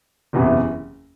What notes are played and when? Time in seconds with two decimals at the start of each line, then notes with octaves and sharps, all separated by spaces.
0.33 F#1 E2 C3 E3